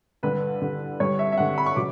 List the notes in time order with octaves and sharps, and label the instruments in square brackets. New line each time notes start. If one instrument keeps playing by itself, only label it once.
[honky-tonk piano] G2 D3 G3 [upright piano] B4
[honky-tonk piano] G2 D3 G3
[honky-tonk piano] G2 D3 G3 [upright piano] C#5
[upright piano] E5
E5
[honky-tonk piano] G2 D3 G3 [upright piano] F#5
[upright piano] B5
C#6
[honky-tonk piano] C#3 F#3 [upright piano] D6